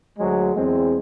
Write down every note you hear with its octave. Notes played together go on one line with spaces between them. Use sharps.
D2 F#3 G#3
E2 G#3 C4